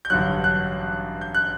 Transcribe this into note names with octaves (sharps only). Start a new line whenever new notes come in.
G6
A1 G2 D3 F#3 F#6
F#6
G6
F#6